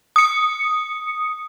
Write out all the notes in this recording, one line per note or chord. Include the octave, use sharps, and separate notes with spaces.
D#6 C#7